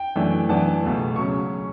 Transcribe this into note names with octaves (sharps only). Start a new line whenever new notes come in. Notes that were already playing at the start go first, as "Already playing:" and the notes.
Already playing: G5
F#2 E3 A3 D4
F#2 E3 B3 D4 A5
C#2 B2 A3
C#3 F#3 C#4 C#6